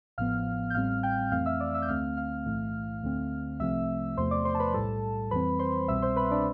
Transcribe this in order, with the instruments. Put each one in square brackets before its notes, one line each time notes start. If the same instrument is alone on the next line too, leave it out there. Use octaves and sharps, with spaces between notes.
[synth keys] A1 A2 F3 B3 F5 F6
G6
A1 A2 G3 C4 F5 F6
G5 G6
F2 E3 A3 C4 F5 F6
E5 E6
D5 D6
E5 E6
G6
D2 D3 A3 C4 F5 F6
F5 F6
B1 A2 E3 A3
D2 D3 A3 C4
C2 C3 F3 A3 C4 E5 E6
E2 C3 F3 A3 C5 C6
D5 D6
C5 C6
A5
B4 B5
B1 A2 G3 A4 A5
F2 E3 G3 C4 B4 B5
C5 C6
C2 B2 G3 C4 E5 E6
C5 C6
B4 B5
D4 D5